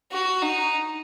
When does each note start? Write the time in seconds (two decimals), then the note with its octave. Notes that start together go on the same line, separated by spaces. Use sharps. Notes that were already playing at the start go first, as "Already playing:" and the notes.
0.12 F#4
0.42 D#4